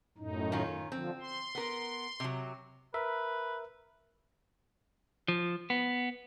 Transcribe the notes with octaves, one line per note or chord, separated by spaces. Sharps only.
F#2 A2 D#4
D#3 C#4 F4
D3 F3 C4
C6
B3 A#4
C3 F#3
A#4 B4 E5
F3
B3